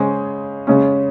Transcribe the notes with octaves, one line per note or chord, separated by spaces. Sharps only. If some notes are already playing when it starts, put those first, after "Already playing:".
Already playing: C#3 G#3 C#4 G#4 C5
C#3 G#3 C#4